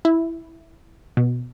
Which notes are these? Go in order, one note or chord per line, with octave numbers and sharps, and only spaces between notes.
E4
B2